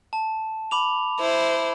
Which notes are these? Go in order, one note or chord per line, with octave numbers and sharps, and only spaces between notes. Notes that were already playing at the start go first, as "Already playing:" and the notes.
A5
B5 D6 F7
E4 C5